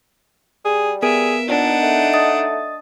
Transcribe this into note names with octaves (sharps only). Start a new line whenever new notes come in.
G3 G#4
B3 G#4 A#4 E5 D7
A#2 D4 D#4 F#5
A3
D#5 D#6 A6